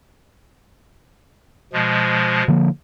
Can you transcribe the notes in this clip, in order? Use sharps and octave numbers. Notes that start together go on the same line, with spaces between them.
B2 F3 G#3
D3 F3 A#3